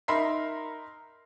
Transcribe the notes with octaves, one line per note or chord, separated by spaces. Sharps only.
D#4 A#4 E5 B5 C6 C7